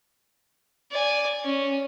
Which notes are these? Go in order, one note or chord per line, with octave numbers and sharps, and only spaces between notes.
D5 G#5
C#4